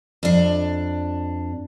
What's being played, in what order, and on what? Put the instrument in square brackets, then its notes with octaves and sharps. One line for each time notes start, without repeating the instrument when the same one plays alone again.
[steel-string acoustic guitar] F2 D4